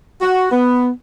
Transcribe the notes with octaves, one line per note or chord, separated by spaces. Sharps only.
F#4
B3